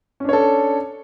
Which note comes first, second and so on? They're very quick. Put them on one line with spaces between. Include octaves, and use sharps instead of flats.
C#4 D4 C#5 A4